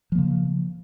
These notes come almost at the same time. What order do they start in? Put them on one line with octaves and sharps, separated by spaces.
F3 A#3 C#3